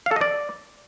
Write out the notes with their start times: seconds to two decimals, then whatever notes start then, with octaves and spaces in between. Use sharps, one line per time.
0.06 F5
0.11 A4
0.16 D#5
0.21 D5